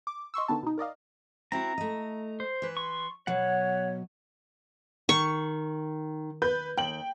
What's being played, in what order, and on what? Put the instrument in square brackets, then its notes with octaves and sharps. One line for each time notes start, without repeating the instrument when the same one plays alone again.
[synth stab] D6
D#5 C6 C#6 E6
D3 D#3 B3 A5
B2 D#4
A#4 D5 D#5 F5
[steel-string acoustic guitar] C4 E4 F#4 [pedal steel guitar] A#5
[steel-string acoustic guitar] A3 D#5
[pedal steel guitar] C5
[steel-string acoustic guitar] E3 B4
[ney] C6 [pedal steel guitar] C#6
[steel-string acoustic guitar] B2 F#3 [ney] C#5 [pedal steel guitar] F#5
[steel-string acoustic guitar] D#3 [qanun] C#6
[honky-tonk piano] B4 G6
[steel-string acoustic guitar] D#2 [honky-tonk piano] G5 F#7